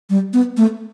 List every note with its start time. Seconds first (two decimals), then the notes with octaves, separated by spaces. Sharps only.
0.10 G3
0.33 B3
0.57 A3